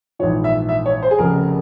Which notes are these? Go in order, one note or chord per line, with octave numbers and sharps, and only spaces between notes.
A#1 G#2 E3 C#5
E5
E5
C#5
C5
G#4
F1 F2 C#3 A#4